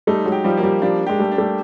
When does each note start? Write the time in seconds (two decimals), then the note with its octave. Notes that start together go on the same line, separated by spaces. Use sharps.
0.07 G3 A3 D#4
0.26 F#3 G#3
0.32 G4
0.44 F3 G3
0.57 F#3 A#3
0.63 F3 G3
0.82 F3 G3 D4
1.07 G#3 G4
1.19 G3 A3
1.32 D4
1.38 G3 A3